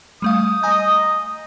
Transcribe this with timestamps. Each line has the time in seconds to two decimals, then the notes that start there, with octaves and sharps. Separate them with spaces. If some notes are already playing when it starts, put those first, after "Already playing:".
0.22 G3 A3 F5 D#6
0.63 D#5 G#5 A#5 G6